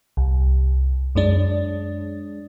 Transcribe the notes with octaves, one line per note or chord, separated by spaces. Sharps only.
C2
F#2 G#3 D4